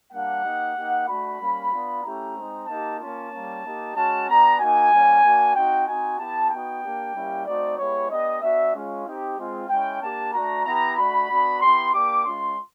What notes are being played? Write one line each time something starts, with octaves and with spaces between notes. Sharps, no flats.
G3 A#3 D4 F#5
A#3 D#4 G4
A#3 D#4 G4
A3 D4 F#4 B5
G3 A#3 C#4
B3 D4 F4
A3 C#4 E4 G4 A#5
G#3 C4 D#4
A#3 D#4 G4 A5
A#3 C#4 F4 A5
G3 A#3 C#4
A#3 D#4 G4
G#3 C#4 F#4 A5
B3 D4 G4 A#5
A#3 D#4 F#4 G#5
G3 A#3 C#4
A#3 D4 F#4
C4 D#4 F#4 G5
C4 D#4 F#4 G#5
B3 E4 G4 A5
B3 D#4 F#4 G5
A#3 D4 G4
G3 A#3 C#4 E4 G4
A3 C4 D#4 F#4 D5
G#3 B3 E4 G4 C#5
B3 D4 G4 D#5
B3 D4 F#4 E5
G#3 C#4 F4
C4 D#4 G4
G#3 C4 F4
G#3 C#4 E4 G5
A#3 D4 G4 A5
A3 D4 F#4 A#5
B3 E4 G4 A#5
A3 D4 F#4 B5
B3 D4 F#4
B3 E4 G4 C6
A#3 D4 G4 D6
G#3 C#4 F4 C6